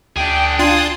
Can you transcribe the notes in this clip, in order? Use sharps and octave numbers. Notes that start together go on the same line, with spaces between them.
D2 D4 G#4 G5
D4 F4 G#4 C6